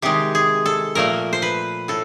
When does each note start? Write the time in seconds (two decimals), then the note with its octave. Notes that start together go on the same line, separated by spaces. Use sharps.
0.02 C3 D#3 G#3 G4
0.35 G#4
0.66 A4
0.95 A#2 F3 A3 A#4
1.33 C5
1.42 B4
1.88 A2 A4